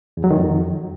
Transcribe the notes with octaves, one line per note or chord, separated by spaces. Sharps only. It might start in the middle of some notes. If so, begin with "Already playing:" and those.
E2
F#3
D#3
F2